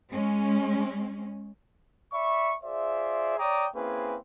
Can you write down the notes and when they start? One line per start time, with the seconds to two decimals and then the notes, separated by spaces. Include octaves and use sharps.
0.11 G#3 C#4
2.13 D5 E5 B5 C#6
2.64 F4 G#4 C5 D5 E5
3.39 C#5 D5 G5 A#5 D6 D#6
3.75 A#3 C4 C#4 E4 G#4 B4